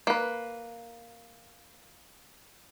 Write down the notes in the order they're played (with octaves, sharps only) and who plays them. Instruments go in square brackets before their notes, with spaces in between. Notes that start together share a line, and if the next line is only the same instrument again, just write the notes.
[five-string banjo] A#3 B4